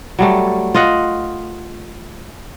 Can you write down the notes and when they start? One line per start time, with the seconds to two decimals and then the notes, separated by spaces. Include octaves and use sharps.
0.19 F#3 G3 A3
0.75 F4 D#5 F#5